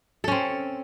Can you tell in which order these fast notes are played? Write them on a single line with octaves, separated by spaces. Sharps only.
A4 C#4 C4